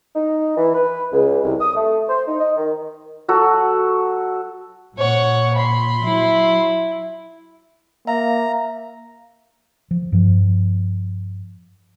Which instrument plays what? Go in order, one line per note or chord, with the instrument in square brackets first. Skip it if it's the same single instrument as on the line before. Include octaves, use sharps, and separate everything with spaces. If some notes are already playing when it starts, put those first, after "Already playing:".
[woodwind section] D#4
E3
B4
C#2
C2
D#6
A3
C5
D#4
D#5
D#3
[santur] F#3 F#4 A4
[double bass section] A#2 [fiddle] C#5 F#5
[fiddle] B5 C6
[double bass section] F#3 [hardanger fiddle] E4
[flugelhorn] A#3 [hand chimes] E5 F5 [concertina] A#5
[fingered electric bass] F3
G2 F3